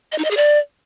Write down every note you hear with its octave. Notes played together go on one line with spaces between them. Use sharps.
D#5
D#4
D#5
G#4
D5